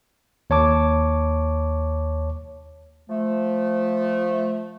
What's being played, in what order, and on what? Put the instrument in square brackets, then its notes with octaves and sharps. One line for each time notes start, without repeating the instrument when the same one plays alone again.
[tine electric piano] D#2 C#5 A5 D6
[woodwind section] F3 A3